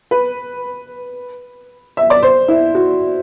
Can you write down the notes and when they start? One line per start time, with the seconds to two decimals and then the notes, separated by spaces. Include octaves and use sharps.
0.11 B4
1.97 E5
2.10 D5
2.23 C5
2.48 E4
2.75 F#4